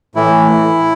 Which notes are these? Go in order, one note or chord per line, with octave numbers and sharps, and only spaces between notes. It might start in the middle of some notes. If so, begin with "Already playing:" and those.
A2 E3 E4